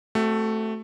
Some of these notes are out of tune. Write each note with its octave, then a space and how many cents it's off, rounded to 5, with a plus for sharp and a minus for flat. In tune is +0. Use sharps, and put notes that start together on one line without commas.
A3 +0 C4 +0 F#4 +25